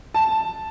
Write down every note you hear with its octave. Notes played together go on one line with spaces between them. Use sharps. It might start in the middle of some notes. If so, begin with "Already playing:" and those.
A5